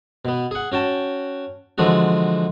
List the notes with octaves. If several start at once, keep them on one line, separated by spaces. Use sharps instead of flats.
B2 B3
G#4 F#5
C#4 F#4 G5 A5
D3 E3 F3 G#3 D4 F#4